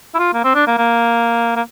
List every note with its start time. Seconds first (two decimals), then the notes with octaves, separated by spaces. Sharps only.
0.14 E4
0.19 F4
0.34 A#3
0.44 C4
0.55 D4
0.67 A#3
0.78 A#3
1.56 A#3